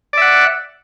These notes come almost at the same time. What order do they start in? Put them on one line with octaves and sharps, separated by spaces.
D5 E5 F#5